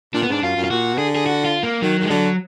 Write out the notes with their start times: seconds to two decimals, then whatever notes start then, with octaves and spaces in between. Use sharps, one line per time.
0.14 A#2 D4
0.23 B3
0.28 G#2 D4
0.42 F#2 F4
0.56 F#2
0.64 F4
0.71 A#2 F#4
0.94 B2
0.98 D3 G#4
1.16 G#4
1.26 F#4
1.45 F4
1.63 A#3
1.82 D#3 F#3
1.99 D#3 G#3
2.10 D3 F#3